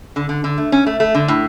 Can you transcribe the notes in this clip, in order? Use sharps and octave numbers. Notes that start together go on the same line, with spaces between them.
D3
D3
D3
A3
C#4
A3
A3
D3
A2